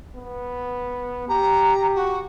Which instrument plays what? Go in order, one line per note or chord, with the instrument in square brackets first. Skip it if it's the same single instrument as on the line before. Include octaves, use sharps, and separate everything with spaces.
[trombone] B3
[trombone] G4 [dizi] A#5
[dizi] F#4